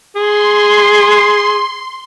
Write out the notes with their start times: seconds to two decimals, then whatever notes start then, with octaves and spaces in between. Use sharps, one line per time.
0.16 G#4 C6